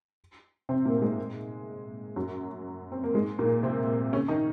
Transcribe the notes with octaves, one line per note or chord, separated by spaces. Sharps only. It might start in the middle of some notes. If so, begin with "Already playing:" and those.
C3 C4
A#2 A#3
A#3
G#2 G#3
F#2 F#3
C4
A#3
G#2 G#3
A#2 A#3
C3 C4
C#3 C#4
D#3 D#4